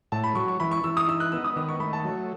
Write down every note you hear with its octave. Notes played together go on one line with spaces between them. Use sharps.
A2 A5
B5
F#3 C#6
C#6
E3 B5
C#6
E3 E6
D#6
D#4 E6
F#6
B3 E6
D#6
D#3 D#6
C#6
A3 B5
A5
F#3